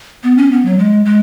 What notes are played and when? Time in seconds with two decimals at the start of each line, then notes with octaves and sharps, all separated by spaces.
0.23 B3
0.37 C#4
0.51 B3
0.65 F#3
0.78 G#3
1.05 G#3